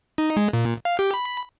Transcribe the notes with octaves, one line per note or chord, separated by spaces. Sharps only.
D#4
G#3
A#2
F5
G4
B5